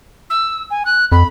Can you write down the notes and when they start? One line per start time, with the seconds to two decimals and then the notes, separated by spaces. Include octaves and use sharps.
0.30 E6
0.70 G#5
0.85 F#6
1.12 F2 B5